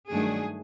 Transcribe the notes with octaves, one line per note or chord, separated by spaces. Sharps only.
G2 D#3 F#3 A3 D4 G#4